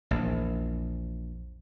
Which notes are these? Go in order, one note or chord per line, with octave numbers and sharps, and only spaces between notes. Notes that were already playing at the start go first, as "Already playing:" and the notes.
A#1 E2